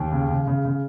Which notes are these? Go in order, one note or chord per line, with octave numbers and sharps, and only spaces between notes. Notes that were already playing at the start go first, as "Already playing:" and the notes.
Already playing: D#2
C#3
C#3
C#3
C#3